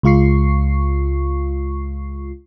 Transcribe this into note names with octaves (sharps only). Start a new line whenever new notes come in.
C#2 G#3 F4 C#6 C7